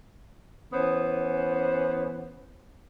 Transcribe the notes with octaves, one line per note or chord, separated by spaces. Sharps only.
E3 B3 C#4 C5